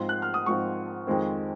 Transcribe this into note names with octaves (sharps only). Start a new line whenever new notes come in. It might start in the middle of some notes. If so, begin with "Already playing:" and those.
Already playing: G#2 F3 C4 C6
F#6
F6
D#6
G#2 F3 C4 C#6
F2 D#3 G#3 C4